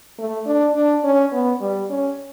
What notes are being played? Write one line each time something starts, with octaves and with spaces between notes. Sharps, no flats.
A3
D4
D4
C#4
B3
G3
C#4